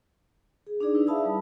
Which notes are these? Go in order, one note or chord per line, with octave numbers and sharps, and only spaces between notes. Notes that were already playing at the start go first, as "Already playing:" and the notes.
G#4
D4 D#4 G#4 D5
E4 B4
E5 F5 A5 B5 D#6 E6
G3